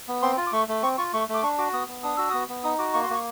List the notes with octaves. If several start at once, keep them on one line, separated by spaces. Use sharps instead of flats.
B3
C4 C6
F4
D6
A3 C#6
A3
C4 C#6
F4 C#6
A3 C#6
A3
D6
D4 C#6
F#4 D6
B3 D#6
B3
D4 D#6
F#4 E6
B3 D#6
B3
D#4 D#6
F#4 D6
A#3 C#6
C6
A#3 C#6